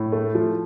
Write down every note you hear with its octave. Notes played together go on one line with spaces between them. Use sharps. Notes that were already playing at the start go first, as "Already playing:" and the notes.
Already playing: A2
A3
F3